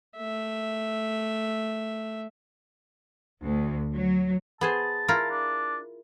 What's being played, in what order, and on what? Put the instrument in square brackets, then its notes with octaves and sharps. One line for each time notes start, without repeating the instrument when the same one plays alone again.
[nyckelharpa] A3 E5
[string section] D2
F#3
[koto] B3 G#4 C5 [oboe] A5
[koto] E4 F4 A#4
[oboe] D4